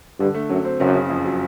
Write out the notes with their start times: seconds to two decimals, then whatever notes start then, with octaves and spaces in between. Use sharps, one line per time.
0.19 G2 D3
0.34 A3
0.49 F#2 F#3
0.65 C4
0.80 F#1 F#2
0.95 C#3
1.10 F2
1.25 F#3